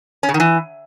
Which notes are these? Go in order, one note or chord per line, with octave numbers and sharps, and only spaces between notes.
C#4
C#3
D#3
E3